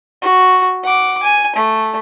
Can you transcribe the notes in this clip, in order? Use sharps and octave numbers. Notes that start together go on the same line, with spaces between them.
F#4
F#5 D6
G#5
A3